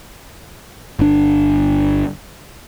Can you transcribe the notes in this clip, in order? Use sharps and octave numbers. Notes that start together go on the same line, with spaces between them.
G1 D4